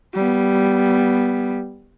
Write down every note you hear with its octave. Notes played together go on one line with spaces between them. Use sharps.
G3 B3